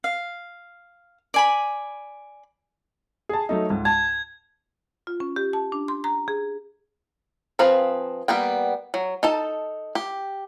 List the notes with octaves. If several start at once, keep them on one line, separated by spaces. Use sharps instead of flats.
F5
D5 G#5 B5
G#4 A5
F#3 A3 D#4
C#2 G#2
A5 G#6
F4
C#4
G4
A5
D4
C6
A#5
G#4
F3 C4 G#4 B4 F5
G3 A#3 B3 G5
F#3
D#4 A4 A5
G4